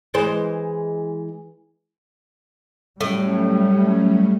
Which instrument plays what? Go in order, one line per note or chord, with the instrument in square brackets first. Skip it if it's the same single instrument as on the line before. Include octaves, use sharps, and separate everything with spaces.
[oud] E3 G#3 C5
[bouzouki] A2 [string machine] F#3 C#4 [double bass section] G3 A3